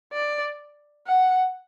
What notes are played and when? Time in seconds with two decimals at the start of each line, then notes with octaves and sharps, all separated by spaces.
0.13 D5
1.07 F#5